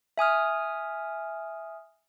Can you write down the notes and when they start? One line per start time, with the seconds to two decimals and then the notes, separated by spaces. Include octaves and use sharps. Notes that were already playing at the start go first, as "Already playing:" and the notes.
0.18 E5 G#5 D#6 F6